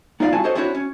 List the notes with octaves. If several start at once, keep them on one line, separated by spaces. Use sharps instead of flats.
B3 D#4 F4 D5 F5
G2 C4 E4 F#4 G#5 A5
F#4 G4 A4 C5 C#5 D#5
B3 C4 D4 E4 F#4 C#5
C#4